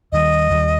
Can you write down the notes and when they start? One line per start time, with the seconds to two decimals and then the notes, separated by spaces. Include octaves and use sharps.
0.12 D#2 D#3 G3 D#5
0.50 D#2 D#3 G3